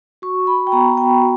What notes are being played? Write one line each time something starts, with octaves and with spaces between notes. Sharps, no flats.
F#4 C#6
F#4 B5
G5
B3 A#5
B3 G5
F#4